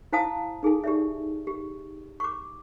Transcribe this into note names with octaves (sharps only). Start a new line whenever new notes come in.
E4 C5 F5 G#5 A5 D#6
D#4 G#4 A4 G#5
G4 D5 E5
G4
C#6 D6